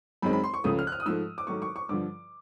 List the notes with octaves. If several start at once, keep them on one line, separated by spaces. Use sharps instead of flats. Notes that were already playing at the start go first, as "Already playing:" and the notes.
F#2 D#3 G#3 C4 B5
B5
C6
C#6
C#2 C#3 F3 A3 D#6
F6
F#6
F6
D#6
G#2 F3 A3 E6
D6
G#2 D#3 F#3 A3 C#6
C#6
C#6
G2 D3 F3 D6